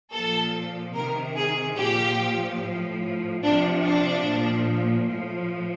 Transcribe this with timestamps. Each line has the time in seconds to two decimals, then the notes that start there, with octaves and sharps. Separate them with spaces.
0.12 A#2 F3 A4
0.94 C3 D#3 A#4
1.36 G#4
1.77 A#2 F3 G4
2.60 A2 F3
3.43 C3 F3 D4
3.83 D4
4.25 A#2 F3
5.07 A2 F3